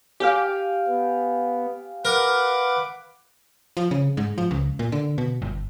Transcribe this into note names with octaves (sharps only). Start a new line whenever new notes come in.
G4 F5 G5 G#5
B3
A#4 B4 F#5 D6
F3
C#3
G#2
F3
C#2
A#2
D3
B2
G1